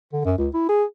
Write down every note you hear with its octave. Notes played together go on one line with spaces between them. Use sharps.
D3
F#2
C#2
E4
G#4